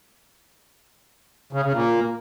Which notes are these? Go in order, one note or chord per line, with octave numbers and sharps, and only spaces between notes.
C#3
C#3
A#2